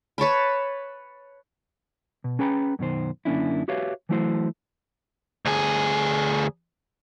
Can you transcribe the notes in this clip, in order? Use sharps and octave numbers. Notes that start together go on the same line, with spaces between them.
B4 C#5 A5 B5
B2
C#4 G#4 B4 G5 A#5 B5
F#2 B2 D#3 C5
F#2 D3 A#3 C#4 D4 E4
F#4 G4 B4 C#5 E5 F5
E3 F#3 A3 E4 F#4 C5
D2 G#4